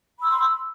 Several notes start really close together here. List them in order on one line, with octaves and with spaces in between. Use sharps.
B5 E6 C6